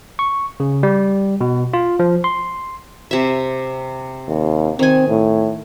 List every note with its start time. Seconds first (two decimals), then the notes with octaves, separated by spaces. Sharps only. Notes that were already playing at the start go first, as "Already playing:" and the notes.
0.19 C#6
0.60 C#3
0.83 G3
1.41 B2
1.74 F4
1.99 F3
2.24 C6
3.11 C3 E5
4.28 D#2
4.79 D#3 C4 G#5
5.09 A2